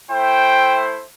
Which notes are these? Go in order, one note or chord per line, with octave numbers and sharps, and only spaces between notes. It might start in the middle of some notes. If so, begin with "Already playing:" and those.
A3 E4 C5 G5